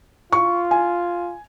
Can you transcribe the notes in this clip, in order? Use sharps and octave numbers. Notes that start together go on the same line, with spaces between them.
F4 C#6
G#5